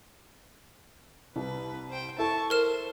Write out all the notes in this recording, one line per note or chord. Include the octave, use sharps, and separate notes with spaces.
C2 B4
C5 G5
E4 A4 A5 C#6
A#4 C5 F6 E7